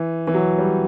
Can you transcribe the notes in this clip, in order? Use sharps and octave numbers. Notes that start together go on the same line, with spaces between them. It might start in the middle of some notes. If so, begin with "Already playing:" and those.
Already playing: E3
E3
F#3
G3